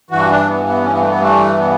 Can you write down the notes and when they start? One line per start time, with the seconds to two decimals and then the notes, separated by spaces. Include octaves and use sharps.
0.11 G2 E3 F#4
0.29 D4
0.47 B3
0.66 B3
0.84 C#4
0.92 B3
1.00 A3
1.08 B3
1.21 A3
1.57 B3